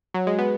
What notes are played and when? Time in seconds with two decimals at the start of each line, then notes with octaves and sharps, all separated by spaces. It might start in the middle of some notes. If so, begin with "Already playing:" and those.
0.14 F#3
0.27 G#3
0.39 B3